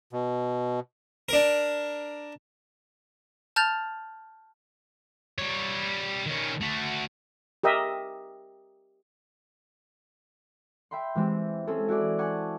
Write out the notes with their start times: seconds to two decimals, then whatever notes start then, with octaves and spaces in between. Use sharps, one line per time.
0.13 B2
1.29 D4 A#4
3.56 A5 F6 G6 A6 F7
5.38 G3 C#5
6.26 D#3 C#4
6.61 A3 F#4
7.63 G4 A#4 D#5 E5
10.91 E5 G5 B5 C6
11.15 E3 G#3 C4 G4
11.67 C4 C#4 G#4 A4
11.88 E4 F#4 G#4 D5
12.19 F#5 G#5 A5 C#6 D6